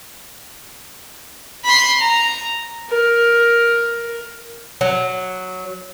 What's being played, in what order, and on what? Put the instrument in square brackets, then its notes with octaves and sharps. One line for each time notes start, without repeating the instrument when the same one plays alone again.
[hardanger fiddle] B5 C6
A#5
[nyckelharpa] A#4
[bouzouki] F#3